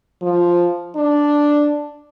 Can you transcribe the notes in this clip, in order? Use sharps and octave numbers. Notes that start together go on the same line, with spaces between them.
F3
D4